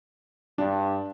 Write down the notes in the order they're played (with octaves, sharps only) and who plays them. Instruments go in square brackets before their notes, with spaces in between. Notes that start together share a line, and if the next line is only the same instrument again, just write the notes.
[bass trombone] G2 [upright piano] D4